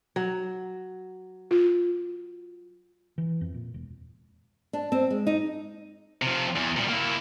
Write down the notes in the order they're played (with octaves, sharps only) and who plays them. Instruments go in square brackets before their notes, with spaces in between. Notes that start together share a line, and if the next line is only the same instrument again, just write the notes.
[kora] F#3
[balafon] F4
[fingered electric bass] E3
F2
A#2
E1
[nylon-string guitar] D4
C4
G#3
D#4
[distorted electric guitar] C3 F3
E2
A#2 G3
A#3 E4